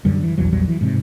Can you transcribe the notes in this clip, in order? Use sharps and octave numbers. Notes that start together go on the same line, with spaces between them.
F#2 D3 G3
E3
A#1 E2 E3 F#3
A#1 E2 F#3 G3
E3
G#2 C3